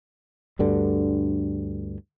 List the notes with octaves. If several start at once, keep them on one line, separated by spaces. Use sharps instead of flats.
D2 G2 D3